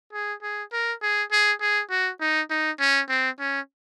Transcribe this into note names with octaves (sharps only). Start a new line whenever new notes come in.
G#4
G#4
A#4
G#4
G#4
G#4
F#4
D#4
D#4
C#4
C4
C#4